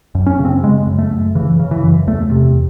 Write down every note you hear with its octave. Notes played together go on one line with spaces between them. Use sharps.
F#2
C#4
C#3
C4
C#3 G#3
F#2
A3
F#2
C#3 E3
C#3
E3
F#2
E2 A3
C3